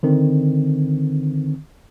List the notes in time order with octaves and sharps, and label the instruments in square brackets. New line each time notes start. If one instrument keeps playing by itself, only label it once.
[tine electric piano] D3 D#3 C4